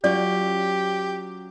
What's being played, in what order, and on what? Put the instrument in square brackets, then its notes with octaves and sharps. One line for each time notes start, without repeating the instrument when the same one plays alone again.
[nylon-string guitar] F#3 C#4 F4 [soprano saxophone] G4 [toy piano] D5